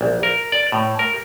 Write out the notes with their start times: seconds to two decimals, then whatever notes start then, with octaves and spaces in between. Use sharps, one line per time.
0.01 A#1
0.23 A#4
0.52 D5
0.72 A2
0.99 A#4